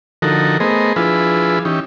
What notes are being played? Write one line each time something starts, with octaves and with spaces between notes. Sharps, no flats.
D3 F3 D#4 F#4 A4 A#4
A3 B3 G#4 A#4 C5 D#5
F3 D4 E4 F4 G#4 B4
E3 C#4 D#4 G4